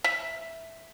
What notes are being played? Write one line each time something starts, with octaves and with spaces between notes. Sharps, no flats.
E5